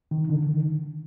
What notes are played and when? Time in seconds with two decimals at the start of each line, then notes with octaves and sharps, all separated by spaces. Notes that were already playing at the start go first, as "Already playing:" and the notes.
0.11 D#3
0.29 D3
0.47 D#3